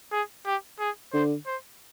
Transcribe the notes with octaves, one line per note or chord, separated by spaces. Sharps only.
G#4
G4
G#4
D3 C5
C5